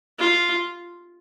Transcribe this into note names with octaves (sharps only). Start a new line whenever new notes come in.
F4